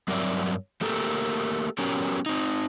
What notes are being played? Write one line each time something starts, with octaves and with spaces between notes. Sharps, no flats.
G2 F#3 C4 A#4 D5 E5
A3 A#3 G4 A4 A#4
F#3 B3 C#4 G4 A#4
C4 D#4